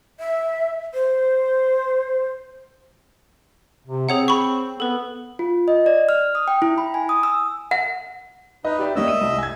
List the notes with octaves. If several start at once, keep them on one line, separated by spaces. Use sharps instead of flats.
E5
C5
C3
C4 G#4 C#5 F#5
B5 C#6
B3 A4 B4
F4
D#5
D5
F6
D#6
G5
E4
B5
G#5
D#6
E6
F#5
D#4 B4 D#5
G4 D5 E5
G3 A#3 C#4 D#5 E5 E6
D#7
C2
G#5 G#6